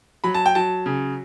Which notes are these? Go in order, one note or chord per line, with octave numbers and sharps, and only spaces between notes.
F#3 B5
A5
G5
F#3 A5
C#3